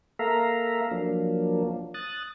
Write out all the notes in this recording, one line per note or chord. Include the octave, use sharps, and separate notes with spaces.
A#3 A4 E5 F5 A#5
F3 F#3 A#3 D4
D#6 F#6 A6